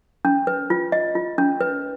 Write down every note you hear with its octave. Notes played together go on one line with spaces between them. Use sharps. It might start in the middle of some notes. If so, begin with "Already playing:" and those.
C#4
B4
F4
D#5
F4
C#4
B4